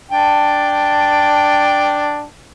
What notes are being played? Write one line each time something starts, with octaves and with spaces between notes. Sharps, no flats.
D4 G5 A5